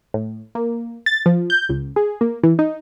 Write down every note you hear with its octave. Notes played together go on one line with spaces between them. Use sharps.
A2
A#3
A6
F3
G6
C#2
G#4
A#3
E3
D#4